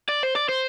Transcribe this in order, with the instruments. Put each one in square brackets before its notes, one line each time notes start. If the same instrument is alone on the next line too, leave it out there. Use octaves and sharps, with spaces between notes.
[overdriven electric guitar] D5
C5
D5
C5